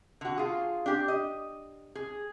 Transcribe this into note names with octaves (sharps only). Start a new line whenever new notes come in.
D3 F#4
F4 G#4
D4 G4
D#5
G#4